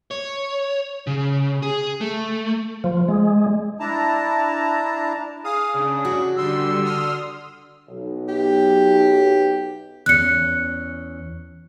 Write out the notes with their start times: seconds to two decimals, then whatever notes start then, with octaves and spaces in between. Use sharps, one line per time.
0.11 C#5
1.07 C#3
1.62 G#4
2.01 A3
2.84 F3
3.08 G#3
3.80 D4 E4 A5 A#5
5.44 G#4 F5 D#6
5.74 C#3 D4
6.05 F#4
6.37 D3 G3 C6 E6
6.84 C6 D#6 F6
7.88 B1
8.29 G4
10.06 E2 C#4 F#6 C#7